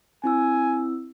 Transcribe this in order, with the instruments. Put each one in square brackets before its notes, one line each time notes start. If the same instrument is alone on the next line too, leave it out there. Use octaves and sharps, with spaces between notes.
[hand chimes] C4 E4 E6 [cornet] G#5